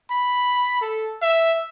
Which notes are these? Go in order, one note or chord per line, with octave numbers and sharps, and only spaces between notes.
B5
A4
E5